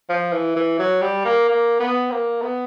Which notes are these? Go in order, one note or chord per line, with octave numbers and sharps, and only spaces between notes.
F3
E3
E3
F#3
G3
A#3
A#3
B3
A#3
B3